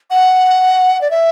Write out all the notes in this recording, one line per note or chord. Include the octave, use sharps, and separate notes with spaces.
F#5
D5
E5